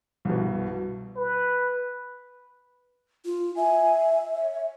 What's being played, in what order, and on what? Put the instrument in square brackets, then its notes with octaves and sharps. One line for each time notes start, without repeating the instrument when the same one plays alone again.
[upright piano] C2 G2 B2
[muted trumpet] B4
[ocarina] F4
[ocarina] E5 [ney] G#5
[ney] C#5